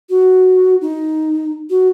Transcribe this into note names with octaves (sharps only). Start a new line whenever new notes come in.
F#4
D#4
F#4